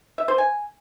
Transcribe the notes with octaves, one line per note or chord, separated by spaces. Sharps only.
E5
C5
G#5